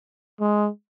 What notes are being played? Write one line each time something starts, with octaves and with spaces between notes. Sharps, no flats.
G#3